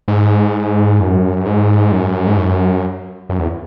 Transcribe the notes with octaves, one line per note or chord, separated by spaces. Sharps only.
G#2
F#2
G#2
F#2
G#2
F#2
F#2
E2